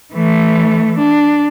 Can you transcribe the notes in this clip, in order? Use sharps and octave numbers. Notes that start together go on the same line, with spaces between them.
E3 A3
D4